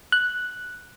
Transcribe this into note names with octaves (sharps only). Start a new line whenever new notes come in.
F#6